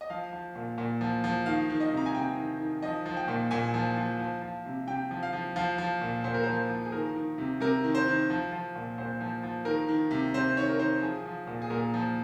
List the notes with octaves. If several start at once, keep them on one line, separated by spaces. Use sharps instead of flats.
D#5
F3 F5
F3
A#2
A#2
F3
F3
D#3 F5
D#3
D#5
C3
A#5
G#5
C3 G5
D#3
D#3
F3 D#5
F3
G5
A#2
A#2 G#5
F3
F3
F3
F3
C3
C3 G5
F3
F5
F3
F3 F5
F3
A#2
A#2 C5
A#4
F3 C5
F3
G#4
D#3 A#4
D#3
C3
C3 A#4
D#3
C5
D#3
F3
F3
A#2
A#2 C5
F3
F3
D#3 A#4
D#3
C3
C3 C5
D#3 C#5
A#4
D#3 C5
F3 G#4
F3
A#2
G#4
A#2 A#4
F3